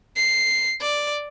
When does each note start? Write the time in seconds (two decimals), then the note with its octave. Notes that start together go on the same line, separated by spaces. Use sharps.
0.17 C7
0.82 D5